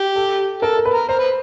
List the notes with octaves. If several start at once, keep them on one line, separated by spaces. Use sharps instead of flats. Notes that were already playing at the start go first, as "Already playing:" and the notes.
Already playing: G4
A4
A4 A#4
A#4
B4
A#4
A#4 C5
B4